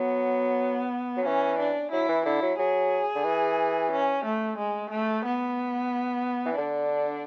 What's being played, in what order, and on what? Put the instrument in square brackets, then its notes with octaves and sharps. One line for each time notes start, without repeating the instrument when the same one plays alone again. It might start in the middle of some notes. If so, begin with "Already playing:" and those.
Already playing: [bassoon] F#3 [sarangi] B3
[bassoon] F#3
[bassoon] E3 [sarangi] C#4
[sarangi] D4
[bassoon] F#3 [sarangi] E4
[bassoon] E3
[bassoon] D3 [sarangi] E4
[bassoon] F#3
[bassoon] F#3 [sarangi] G#4
[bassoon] D3
E3
[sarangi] C#4
A3
G#3
A3
B3
[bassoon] E3
[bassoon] D3 [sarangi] D4